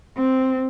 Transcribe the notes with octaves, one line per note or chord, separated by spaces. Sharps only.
C4